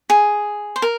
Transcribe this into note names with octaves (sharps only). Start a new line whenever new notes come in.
G#4
C5
A#4